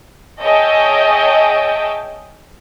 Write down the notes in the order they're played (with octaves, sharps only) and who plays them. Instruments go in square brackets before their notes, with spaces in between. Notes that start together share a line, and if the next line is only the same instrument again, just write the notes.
[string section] G#4 C#5 D#5 E5 G5 A5